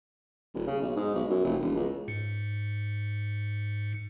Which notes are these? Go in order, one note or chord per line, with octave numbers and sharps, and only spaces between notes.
D#1
C#3
B1
G#2
B1
F#2
F1
E1
C#2
G#2 C#7